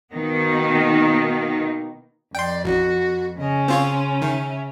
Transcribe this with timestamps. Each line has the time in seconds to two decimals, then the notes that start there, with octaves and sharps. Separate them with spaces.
0.13 B2 D#3 A#3 B3 D#4
2.35 F2 D5 G5 C6
2.65 A1 F#4
3.39 C#3 C#4 D#5
3.68 C4 F4 C#5 C6
4.22 D#3 E5